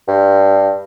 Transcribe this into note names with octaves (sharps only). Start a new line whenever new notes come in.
G2